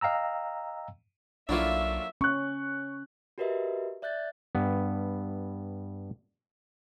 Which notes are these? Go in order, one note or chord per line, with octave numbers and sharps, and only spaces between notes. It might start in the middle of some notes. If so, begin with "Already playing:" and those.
D#5 F5 G5 A#5 E6
B1 F#3 A3 A#3 D4 E4 F4 E5
C#4 C#6 F#6
F#4 G4 A#4 B4 D#5 E5
D5 E5 F#6 G6 A6
G2 B3